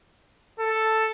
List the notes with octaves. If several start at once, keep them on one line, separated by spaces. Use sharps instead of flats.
A4